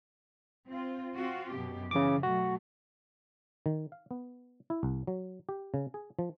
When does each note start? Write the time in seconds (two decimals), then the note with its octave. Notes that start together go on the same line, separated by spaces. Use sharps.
0.68 C4 F4
1.15 C4 F4 F#4
1.53 F#2 B2 G4
1.91 C#3 E3 D6
2.23 B2 F#3 A3 F#4
3.66 D#3
3.92 F5
4.11 B3
4.70 E4
4.83 C2
5.07 F#3
5.49 G4
5.74 C#3
5.94 G#4
6.19 F3